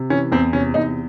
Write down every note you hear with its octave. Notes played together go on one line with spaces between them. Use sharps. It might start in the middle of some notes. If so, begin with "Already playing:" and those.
Already playing: C3
E3 C#4
E2 C4
C3 C#4
E2 D#4